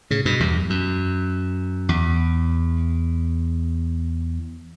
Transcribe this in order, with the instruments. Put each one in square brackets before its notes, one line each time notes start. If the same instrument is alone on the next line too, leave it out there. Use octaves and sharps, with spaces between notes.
[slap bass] A2 C#3
G2 B2
E2 G2
F#2
F#2
E2